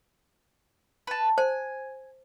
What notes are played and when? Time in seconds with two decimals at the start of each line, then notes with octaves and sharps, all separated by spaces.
1.07 B4 A5
1.38 C5 G#5